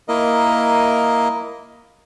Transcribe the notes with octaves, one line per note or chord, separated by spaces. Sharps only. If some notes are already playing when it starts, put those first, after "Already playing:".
A#3 E4 A#4 D#5